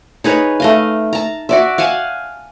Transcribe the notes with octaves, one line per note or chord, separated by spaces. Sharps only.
D#4 G#4 B4 C#5
A3 D#5 F5
A5 A#5
F#4 D5 E5
F5 F#5 G#5 A5